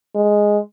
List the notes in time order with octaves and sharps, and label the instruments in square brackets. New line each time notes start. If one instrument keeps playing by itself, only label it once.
[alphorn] G#3